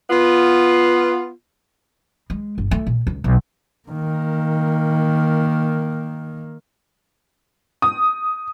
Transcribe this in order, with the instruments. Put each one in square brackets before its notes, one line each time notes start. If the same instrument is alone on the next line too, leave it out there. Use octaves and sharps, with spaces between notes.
[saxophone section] B3 F4
[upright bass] G#3
G1
A3
A#2
C#2
B1
[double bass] D#3 A#3
[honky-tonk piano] D#6